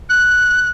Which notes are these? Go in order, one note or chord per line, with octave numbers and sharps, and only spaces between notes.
F#6